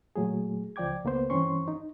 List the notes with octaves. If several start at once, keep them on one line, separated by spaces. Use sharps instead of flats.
A#2 F#3 A3 G#4
C#2 F3 D5 G5 D6 G#6
C#2 A#3 B3 C5
G2 E3 C4 C#4 C6 C#6
D#4